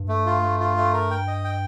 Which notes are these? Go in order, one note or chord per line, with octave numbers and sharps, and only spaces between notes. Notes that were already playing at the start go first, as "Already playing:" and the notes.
Already playing: G2
A3
F4
A3
F4
A3
A#4
G5
D#5
G5